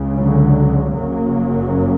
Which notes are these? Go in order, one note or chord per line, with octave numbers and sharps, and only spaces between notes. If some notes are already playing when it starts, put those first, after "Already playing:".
Already playing: C#2 C#3
D3 F#3
F#1 F#2 C#3 F#3 A#3